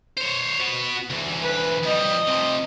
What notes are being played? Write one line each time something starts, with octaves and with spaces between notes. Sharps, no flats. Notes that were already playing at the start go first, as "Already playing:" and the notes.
C5 C#5
B3 F#4
D2 E3
B4
F2 G3 D#5
C3 F3